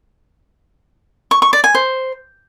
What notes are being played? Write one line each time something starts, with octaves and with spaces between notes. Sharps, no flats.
C#6
C#6
D5
G#5
C5